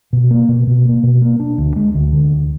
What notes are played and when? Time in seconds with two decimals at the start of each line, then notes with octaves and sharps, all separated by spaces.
0.13 B2
0.31 A#3
0.49 B2
0.67 B2
0.85 A#3
1.03 B2
1.22 A#3
1.40 D4
1.58 D2
1.76 G#3
1.94 D2
2.13 D3
2.31 D2